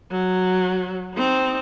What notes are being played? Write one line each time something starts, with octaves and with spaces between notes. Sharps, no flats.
F#3
C4 D#4